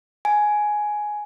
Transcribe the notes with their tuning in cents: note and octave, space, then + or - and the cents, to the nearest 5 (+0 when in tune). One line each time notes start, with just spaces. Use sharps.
G#5 +10